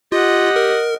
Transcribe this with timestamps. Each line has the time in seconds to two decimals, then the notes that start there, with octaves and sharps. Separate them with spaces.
0.12 F4 G4 D#5 F#5
0.56 A#4